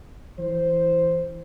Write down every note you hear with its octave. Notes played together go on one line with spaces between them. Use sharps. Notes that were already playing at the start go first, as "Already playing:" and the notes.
E3 C5